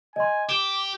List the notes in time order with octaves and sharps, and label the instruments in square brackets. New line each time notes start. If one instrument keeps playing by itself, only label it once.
[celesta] D#5 C6 [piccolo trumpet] G#5
[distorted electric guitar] G4 [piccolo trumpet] D6 [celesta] D7 E7